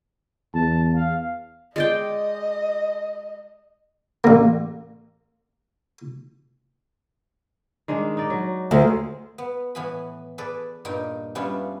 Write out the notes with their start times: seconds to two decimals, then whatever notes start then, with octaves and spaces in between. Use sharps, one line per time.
0.54 E2 A5
0.95 F5
1.76 G#3 D5 D#5 G5
4.24 A1 A#3
7.88 D#3 G#3 D4
8.17 D#4 D5
8.30 F#3
8.71 D2 G#4 A#4 C5
9.38 B3
9.75 A2 E3 B3 G#5 B5
10.38 G#4 A4 B4 D5
10.85 G2 A#2 D#4 D#5 G5
11.35 G3 B3 C#4 D4 E4 F4